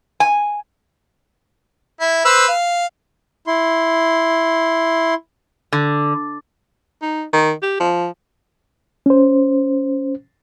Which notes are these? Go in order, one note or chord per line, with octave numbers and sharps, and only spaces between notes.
G#5
E4
B4 C5 E6
F5
E4 C6
D3
D#4
D#3
G4
F3
C#4 C5